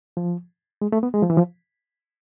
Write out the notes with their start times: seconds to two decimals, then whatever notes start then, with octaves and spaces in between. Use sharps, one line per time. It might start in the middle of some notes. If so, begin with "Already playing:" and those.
0.17 F3
0.82 G#3
0.92 A3
1.03 B3
1.14 G#3
1.22 F3
1.30 E3
1.37 F3